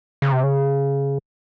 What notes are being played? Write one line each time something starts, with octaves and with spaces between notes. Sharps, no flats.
C#3
C3
C#3